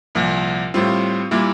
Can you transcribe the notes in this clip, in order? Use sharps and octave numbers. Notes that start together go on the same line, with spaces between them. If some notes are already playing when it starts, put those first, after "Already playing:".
C2 A#2 F3
A2 G3 C4 F4
A#2 G3 A#3 E4